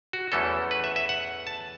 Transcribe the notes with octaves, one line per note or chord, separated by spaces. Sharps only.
F#4
E2 E3 A3 C#4 A4
B4
E5
E5
F#5
A5